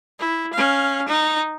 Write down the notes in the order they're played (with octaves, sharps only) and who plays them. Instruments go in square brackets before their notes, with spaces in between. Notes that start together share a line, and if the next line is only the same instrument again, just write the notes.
[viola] E4
C#4 F5
D#4